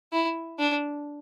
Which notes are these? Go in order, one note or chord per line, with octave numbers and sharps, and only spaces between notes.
E4
D4